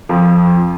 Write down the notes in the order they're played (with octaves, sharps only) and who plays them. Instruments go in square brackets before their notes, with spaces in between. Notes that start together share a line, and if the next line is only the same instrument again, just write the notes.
[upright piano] F2 F3